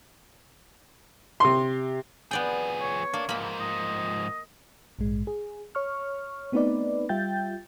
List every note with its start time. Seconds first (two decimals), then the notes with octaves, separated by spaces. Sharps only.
1.40 C3 C6
2.31 F3 B3 G#4 D5 G5
2.81 C#5
3.14 A#3 D4
3.29 G#2 F3 A#3 B5
3.60 D#5
4.99 A#1 G#2 G#3
5.27 G#4
5.75 C#5 C#6 F6
6.52 A3 B3 C4 D#4 B4 D5
7.09 G3 F4 E5 G5 G6 A6